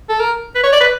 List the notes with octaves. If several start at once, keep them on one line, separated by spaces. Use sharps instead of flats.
A4
A#4
B4
C#5
D5
B4